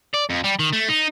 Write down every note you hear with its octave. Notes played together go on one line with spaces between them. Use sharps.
D5
F2
G3
D#3
A3
D#4